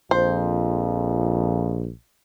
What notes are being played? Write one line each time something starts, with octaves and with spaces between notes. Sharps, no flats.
A#1 F2 C5